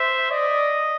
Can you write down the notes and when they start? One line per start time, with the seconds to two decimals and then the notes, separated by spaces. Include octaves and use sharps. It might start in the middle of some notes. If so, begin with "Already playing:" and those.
Already playing: C5 E5
0.31 D5 D#5